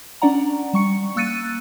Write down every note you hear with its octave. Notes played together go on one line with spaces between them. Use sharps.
C#4 D4 D5 F#5 A#5
G3 C#6 C#7
A#3 E6 F#6 A6 C#7 D#7